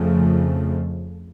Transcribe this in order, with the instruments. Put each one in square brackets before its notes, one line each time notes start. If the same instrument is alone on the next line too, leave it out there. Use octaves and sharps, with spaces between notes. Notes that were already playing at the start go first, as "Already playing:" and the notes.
Already playing: [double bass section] F2 C#3 F3 A3